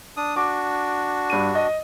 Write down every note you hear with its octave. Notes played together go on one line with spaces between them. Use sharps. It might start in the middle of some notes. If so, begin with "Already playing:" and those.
D4 D#6
D4 F#4 D6
G2 D#7
D#5